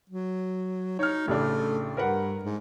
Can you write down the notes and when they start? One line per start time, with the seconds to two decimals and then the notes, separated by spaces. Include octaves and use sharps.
0.09 F#3
0.99 D#4 C#5 F6
1.27 A1 C#3 A3 D4
1.97 G2 A#4 B4 F#5
2.43 G#2